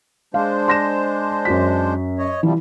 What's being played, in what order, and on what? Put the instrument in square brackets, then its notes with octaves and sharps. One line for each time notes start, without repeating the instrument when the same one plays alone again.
[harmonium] G#3 D4 C5 [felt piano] F5
[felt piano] C6 A#6 E7
F#2 F#4 B6
[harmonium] C#5 D#5
[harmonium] C3 F3 G3 [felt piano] E3